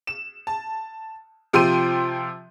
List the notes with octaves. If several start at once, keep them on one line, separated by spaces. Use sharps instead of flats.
E7
A5
C3 F3 G5 C6 D#7